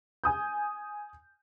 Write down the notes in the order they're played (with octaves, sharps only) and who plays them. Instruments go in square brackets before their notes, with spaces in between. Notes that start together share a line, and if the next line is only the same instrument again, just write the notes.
[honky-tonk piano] G#5 D#6 G6